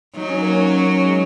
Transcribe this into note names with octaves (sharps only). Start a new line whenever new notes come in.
F#3 D#4
C#4
A#3
C#4
G#3